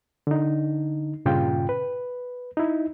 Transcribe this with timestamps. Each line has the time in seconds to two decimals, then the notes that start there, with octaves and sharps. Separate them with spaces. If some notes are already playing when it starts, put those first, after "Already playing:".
0.27 D3 D#4
1.26 G2 A#2 C#3 F4 G5
1.69 B4
2.57 D#4 E4